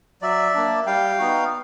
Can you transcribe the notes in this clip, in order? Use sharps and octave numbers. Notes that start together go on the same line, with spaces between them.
F#3 D5 E5
A#3 D4
G3 F5 G5
B3 D#4 F#4